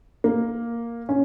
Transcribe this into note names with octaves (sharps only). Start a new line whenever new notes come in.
A#3
C#4